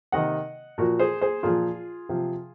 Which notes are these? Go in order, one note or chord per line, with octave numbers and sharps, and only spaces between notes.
C3 D#3 D#5 F#5
A#2 F3 F#4 A#4
G#4 C5
G#4 C5
A#2 F3 F4 G#4
C3 F3